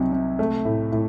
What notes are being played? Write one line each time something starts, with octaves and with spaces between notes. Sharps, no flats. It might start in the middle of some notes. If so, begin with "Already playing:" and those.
Already playing: C2 C3 F#3 D#4
C3
A3
A2
A2